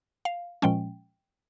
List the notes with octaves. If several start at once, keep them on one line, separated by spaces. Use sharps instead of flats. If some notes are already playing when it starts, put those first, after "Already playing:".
F5
A#2 F3 G#3 C#4 G5